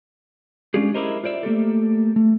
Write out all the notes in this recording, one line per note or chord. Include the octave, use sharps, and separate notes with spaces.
G#3 C#4 D4 F4 G4 G#4
E4 G4 G#4 A#4 C5 D#5
F4 C5 D5 E5
A3 A#3 G4 A4
A3